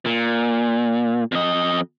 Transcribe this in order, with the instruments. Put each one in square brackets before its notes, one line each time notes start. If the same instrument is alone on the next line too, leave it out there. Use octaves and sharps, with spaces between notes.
[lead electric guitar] A#2
F2 D#5